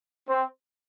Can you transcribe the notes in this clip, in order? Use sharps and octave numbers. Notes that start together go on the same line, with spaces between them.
C4